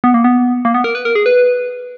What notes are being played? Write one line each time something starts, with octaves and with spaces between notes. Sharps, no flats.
B3
A#3
B3
A#3
B3
A#4
B4
A#4
G#4
B4